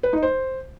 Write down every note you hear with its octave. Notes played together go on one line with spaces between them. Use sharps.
B4
D#4
C5